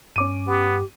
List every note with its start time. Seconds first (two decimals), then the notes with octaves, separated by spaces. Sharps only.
0.16 G2 C#4 D6 D#7
0.47 B3 G4